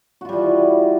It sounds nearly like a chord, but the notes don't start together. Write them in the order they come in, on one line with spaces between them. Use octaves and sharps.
F#4 F4 G3 E3